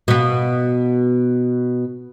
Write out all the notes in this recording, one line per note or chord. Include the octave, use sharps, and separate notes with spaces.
B2 B3